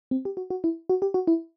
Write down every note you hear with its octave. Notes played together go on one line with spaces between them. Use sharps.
C4
G4
F#4
F#4
E4
F#4
G4
F#4
E4